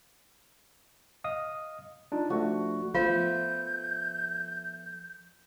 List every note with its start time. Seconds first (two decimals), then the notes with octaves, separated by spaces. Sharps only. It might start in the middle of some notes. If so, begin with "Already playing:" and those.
1.24 D#5 F5 D#6
2.12 D4 D#4 F4
2.30 F3 A3 D4 F#4
2.94 F3 A3 B3 F4 C5 F5 G6